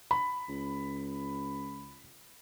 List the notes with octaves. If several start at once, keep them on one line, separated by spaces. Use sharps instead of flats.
B5
C#2